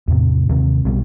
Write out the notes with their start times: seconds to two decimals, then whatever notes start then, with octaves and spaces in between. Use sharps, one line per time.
0.08 E2 A2 C3
0.49 D#2 C3
0.85 B1 B2 G3